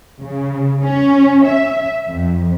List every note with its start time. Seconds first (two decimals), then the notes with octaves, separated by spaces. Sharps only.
0.22 C#3
0.83 C#4
1.44 E5
2.08 F2